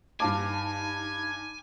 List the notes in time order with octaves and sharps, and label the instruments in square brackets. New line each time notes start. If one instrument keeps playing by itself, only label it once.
[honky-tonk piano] G2 F5 D#7 [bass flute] D#4 [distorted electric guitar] G#5 [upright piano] A5 D6